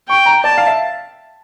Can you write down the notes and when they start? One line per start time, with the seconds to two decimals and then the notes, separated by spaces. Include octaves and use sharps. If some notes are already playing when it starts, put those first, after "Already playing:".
0.09 G5 C#6
0.26 A#5
0.43 D5 A5
0.58 F5
0.67 E5